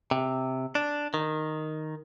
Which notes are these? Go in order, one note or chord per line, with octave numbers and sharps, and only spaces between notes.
C3
D4
D#3